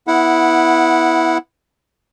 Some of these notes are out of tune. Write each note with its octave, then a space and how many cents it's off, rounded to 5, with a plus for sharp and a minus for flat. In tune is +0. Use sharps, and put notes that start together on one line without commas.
B3 +0 E4 -5 F#5 -15